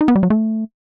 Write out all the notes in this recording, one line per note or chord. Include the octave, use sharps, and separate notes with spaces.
D#4
B3
G3
F#3
A3